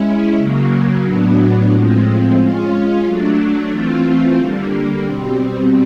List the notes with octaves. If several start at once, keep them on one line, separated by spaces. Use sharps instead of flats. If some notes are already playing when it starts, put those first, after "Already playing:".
Already playing: G#3 C#4 E4
C#3 F#3 A#3
A2 F#3 B3 D4
A2 F3 G#3 C4
G#3 C#4 F4
F#3 A3 D4
E3 A3 C4 F4
D3 G3 A#3
B2 G3 C4